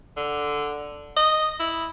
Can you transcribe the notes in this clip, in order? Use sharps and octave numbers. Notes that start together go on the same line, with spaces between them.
D3
D#5
E4